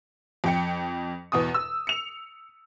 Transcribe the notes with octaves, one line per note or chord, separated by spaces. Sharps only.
F2 G5 C#7
E2 B2 D#6
E6
C#7 F7